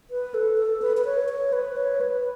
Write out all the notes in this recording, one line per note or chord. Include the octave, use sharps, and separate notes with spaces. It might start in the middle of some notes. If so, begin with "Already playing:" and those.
B4
A4
A4
B4
B4
C#5
C#5
B4
C#5
B4